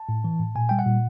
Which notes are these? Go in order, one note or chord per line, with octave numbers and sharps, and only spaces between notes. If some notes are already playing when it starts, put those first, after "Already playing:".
Already playing: A5
A2
E3
A2
A#2 G#5
G3 G5
F#5
A#2